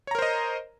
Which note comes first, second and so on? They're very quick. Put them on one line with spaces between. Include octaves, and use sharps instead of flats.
C#5 A#5 A#4 C5 D#5